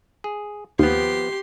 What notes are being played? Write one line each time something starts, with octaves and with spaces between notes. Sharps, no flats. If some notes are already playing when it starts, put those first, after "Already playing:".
G#4
D#2 F3 B3 G4 C6